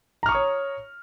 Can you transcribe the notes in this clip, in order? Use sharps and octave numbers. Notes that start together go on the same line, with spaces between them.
C#5 A#5 C#6 D#6 F6